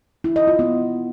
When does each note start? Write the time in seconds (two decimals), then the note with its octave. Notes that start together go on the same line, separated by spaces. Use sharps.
0.24 E4
0.36 D#5
0.47 F4
0.59 B3